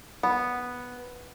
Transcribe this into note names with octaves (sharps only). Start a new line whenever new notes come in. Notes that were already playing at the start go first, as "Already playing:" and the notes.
B3